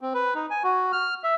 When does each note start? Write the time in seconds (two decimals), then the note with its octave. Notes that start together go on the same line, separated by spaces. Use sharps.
0.01 C4
0.14 B4
0.35 D#4
0.50 G#5
0.64 F#4
0.93 F6
1.24 E5